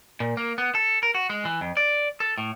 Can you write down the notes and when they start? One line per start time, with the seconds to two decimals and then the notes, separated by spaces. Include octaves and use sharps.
0.20 A#2
0.37 A#3
0.58 B3
0.75 A4
1.03 A#4
1.15 F#4
1.30 G#3
1.45 E3
1.61 F2
1.77 D5
2.20 A4
2.38 A2